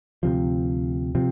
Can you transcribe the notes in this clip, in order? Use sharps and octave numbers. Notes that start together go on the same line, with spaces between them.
D2 C3 F3
C3 F3